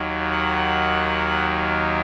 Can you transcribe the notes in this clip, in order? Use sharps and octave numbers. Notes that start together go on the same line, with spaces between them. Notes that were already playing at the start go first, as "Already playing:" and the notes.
Already playing: D#2 D#3 F#3
F#5